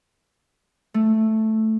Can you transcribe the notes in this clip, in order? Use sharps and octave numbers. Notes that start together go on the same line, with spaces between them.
A3